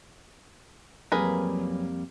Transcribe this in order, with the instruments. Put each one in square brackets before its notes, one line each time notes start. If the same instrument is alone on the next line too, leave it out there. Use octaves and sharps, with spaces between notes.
[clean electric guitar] F2 G3 A#3 [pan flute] F#3 [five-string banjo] G#4 A#4 B4